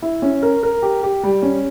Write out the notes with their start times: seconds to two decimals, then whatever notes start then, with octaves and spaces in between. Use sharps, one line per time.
0.02 E4
0.22 C#4
0.42 A#4
0.63 A#4
0.82 G4
1.03 G4
1.23 G3
1.42 C#4